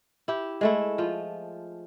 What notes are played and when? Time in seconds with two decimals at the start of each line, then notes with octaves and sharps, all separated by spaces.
0.28 E4 G4
0.61 G#3 A3 E4
0.98 F3 F4